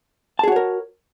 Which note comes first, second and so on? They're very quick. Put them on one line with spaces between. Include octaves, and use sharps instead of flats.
A5 G#4 F#4 C#5 A#4